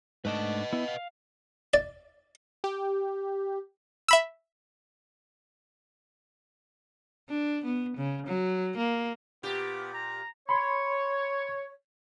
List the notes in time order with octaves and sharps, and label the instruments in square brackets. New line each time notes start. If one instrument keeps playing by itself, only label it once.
[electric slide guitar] G#2 A3 D4 [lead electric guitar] B4 D#5
[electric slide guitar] B3 E4
F5
[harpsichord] D5
[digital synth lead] G4
[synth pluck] E5 B5 E6
[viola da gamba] D4
B3
C#3
F#3
A#3
[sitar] A#2 G4 [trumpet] B3
[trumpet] A#5
[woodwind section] C#5 [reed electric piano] B5 C6